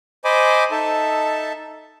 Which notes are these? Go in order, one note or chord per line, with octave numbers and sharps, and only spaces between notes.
C5 D#5 G#5 B5 D6
D#4 A4 E5 A5